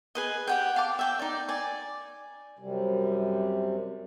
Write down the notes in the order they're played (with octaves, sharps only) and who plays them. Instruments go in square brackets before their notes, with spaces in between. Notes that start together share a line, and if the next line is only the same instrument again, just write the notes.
[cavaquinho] G#4 B4 D#5
G4 F#5 G5
F5 A5 D6
E5 G5 D6
D#4 D5
D5 G#5
[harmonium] F#2 C3 G3